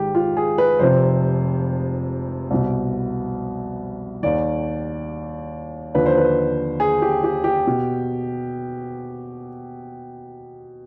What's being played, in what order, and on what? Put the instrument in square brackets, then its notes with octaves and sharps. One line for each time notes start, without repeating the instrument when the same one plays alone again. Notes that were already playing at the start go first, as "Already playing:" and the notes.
Already playing: [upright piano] G#1 G#2 D#3 G4
F4
G#4
B4
F1 F2 C3 C5
C2 B2
D#2 D#3 D5
D#2 D3 F3 B4
C5
B4
G#4
G4
G4
G4
B2